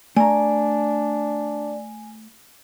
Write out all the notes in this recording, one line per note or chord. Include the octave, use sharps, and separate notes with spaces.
A3 D4 D5 G#5 A#5